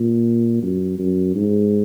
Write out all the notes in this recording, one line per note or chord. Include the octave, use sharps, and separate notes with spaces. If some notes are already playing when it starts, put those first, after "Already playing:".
Already playing: A#2
F#2
F#2
G#2